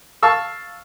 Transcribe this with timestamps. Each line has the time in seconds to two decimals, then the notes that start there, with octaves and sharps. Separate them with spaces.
0.23 F5 A5 C#6 E6